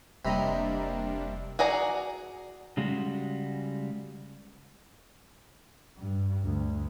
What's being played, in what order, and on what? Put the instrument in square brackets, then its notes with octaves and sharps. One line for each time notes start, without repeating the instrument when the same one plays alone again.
[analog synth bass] F1 [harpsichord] C3 [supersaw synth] G3 A#3 D4 [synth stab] D#5 A#5 B5
[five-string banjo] F#4 G#4 D5 A#5
[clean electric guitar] C#3 G3 G#3 F#4
[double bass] G2
D2